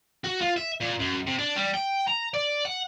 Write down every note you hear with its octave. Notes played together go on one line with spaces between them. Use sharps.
F#4
F4
E5
A#2
F#2
C3
D4
G3
G5
A#5
D5
F#5